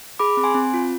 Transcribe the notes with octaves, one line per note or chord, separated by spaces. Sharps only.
G#4 B5 D6
C4
G#5 C6
C4
F4